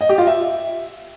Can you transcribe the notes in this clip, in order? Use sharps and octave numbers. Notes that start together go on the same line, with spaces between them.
D#5
G4
F4
E5